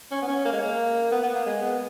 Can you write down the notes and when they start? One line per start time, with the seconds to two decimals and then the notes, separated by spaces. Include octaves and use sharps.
0.11 C#4
0.22 B3
0.28 C#4
0.45 A#3
0.53 G#3
0.61 A#3
1.12 B3
1.23 B3
1.34 A#3
1.46 G#3
1.62 B3